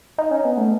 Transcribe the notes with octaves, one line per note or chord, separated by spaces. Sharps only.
D#4
C#4
B3
A3